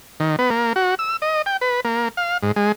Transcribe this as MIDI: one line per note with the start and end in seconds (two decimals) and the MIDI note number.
0.20 0.36 51
0.39 0.50 59
0.50 0.73 58
0.76 0.95 66
0.99 1.17 88
1.22 1.42 75
1.46 1.57 79
1.61 1.80 71
1.85 2.08 58
2.17 2.38 77
2.43 2.52 44
2.56 2.72 56